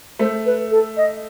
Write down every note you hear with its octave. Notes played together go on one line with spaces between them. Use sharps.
A3 C5
B4
A4
D#5